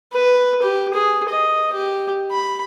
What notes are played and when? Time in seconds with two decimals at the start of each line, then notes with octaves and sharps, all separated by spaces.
0.13 B4
0.62 G4
0.94 G#4
1.29 D#5
1.73 G4
2.31 B5